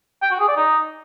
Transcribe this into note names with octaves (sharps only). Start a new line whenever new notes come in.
G5
F#4
G#4
D5
D#4